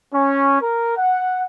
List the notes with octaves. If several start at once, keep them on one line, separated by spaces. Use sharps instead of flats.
C#4
A#4
F#5